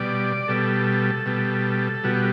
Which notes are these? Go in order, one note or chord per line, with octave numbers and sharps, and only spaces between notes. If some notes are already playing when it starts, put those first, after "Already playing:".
Already playing: B2 G3 D5
B2 G3 A4
B2 G3
B2 G3 F#4